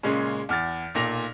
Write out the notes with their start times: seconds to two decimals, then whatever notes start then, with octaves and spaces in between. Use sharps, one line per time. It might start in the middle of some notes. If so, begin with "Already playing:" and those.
0.03 A#2 C#3 G#3 C#4
0.49 E2 F6 A6
0.95 B1 A#2 A#6 F7